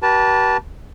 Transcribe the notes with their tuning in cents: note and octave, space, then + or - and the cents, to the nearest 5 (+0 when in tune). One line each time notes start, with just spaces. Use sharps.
G4 -40 B4 -40 A5 +0